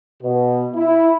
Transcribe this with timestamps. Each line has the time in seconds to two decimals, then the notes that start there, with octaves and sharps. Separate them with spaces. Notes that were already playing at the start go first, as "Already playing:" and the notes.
0.22 B2
0.75 E4